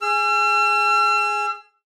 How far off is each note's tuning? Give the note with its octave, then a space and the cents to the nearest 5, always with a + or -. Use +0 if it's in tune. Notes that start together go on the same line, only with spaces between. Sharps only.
G#4 +0 E6 +45